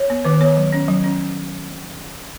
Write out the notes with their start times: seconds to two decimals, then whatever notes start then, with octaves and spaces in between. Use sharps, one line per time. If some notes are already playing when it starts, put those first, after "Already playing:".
Already playing: C#5
0.10 B3
0.25 D#3 B4
0.41 B3 C#5
0.57 F#3
0.72 C#4
0.88 F#3
1.04 C#4